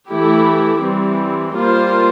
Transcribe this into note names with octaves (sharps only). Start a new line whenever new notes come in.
E3 A3 E4 G4
E3 G3 C4
G3 A#3 F4 C5